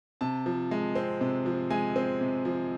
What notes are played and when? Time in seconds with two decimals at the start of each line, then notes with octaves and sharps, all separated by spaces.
0.21 C3 A5
0.46 F3
0.71 G#3
0.95 C4
1.21 C3
1.46 F3
1.70 G#3 G#5
1.96 C4
2.21 C3
2.45 F3